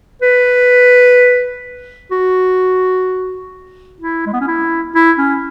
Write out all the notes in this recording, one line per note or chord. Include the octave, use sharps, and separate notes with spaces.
B4
F#4
E4
G#3
B3
C#4
E4
E4
C#4